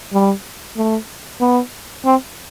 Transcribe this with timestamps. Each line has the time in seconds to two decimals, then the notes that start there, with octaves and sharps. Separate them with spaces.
0.13 G3
0.77 A3
1.40 B3
2.05 C4